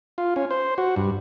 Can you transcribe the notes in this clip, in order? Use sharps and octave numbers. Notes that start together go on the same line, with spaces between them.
F4
C#4
C5
F#4
G2